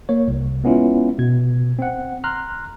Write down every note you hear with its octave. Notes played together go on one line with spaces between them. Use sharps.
A#3 C#5
C2
G#3 B3 C#4 E4 F4
B2 G#6
C4 F#5
A#5 C6 F6 F#6